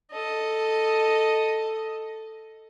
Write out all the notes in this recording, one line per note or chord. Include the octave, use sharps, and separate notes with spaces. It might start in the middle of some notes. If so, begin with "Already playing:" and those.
A4 D#5